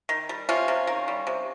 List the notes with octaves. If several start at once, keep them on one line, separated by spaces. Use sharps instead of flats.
D#3
G3
C3 C#4 F4
C3
D#3
G3
C3